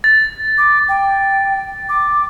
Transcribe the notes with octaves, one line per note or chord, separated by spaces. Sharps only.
A6
D6
G5
D6